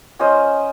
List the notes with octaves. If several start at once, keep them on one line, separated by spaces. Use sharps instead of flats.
C#4 F4 C5 D#5